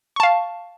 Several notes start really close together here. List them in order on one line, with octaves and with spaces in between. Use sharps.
C#6 A5 F5